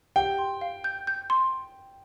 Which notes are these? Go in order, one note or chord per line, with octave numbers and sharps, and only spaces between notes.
G4 G5
C6
F5
G6
G6
C6